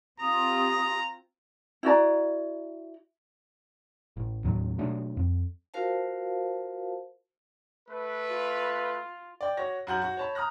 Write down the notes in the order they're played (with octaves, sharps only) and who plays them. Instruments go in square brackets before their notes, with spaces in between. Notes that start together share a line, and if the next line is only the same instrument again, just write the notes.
[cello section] C4 F4 [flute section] G4 D#6 [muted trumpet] A#5
[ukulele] E4 F#4 D5 A#5
[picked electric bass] A1
D#2 A2 F#3
B2 F#3 A3 D4
F2
[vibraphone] F4 F#4 A#4 C5 F5 A5
[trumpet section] A3 B4
[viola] F4
[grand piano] D5 G5 D6
F#4 C#5 A#6
F#2 F#4 G6 F#7
F#4
C#5 A5 B5
A#5 D#6 F6 F#6 A#6